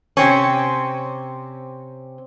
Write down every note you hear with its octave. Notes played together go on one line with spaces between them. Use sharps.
C3 C4 C#4